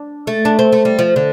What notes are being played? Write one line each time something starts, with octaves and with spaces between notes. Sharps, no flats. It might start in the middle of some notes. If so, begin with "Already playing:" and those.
Already playing: D4
A3
D4
C4
A3
G3
F3
D3